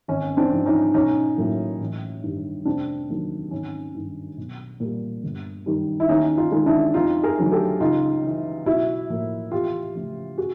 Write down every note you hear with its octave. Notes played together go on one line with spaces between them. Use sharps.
G#1 C#4
C4 D4
G#2 F3
C#4 D#4
B1 C#4 D#4
A2 F#3 A#3
A1
G2 D#3 G3
F1 C4 D4
D#2 D#3 F#3 A#3
G#1 C#4 D#4
G2 D#3
B1
A#2 G3
G1
F#2 D#3 G3
E4
D#2 C#4 D#4
D#4 F4
D#3 G#3
D4 E4
F2 D#4 F4
G#4 A#4
D3 F#3 A3
G4 A4
C#2 D#4 F4
C#3 E3
B1 E4 F#4
A2 F3 A#3
E2 F4 G4
C#3 F3 A3
F#4 G#4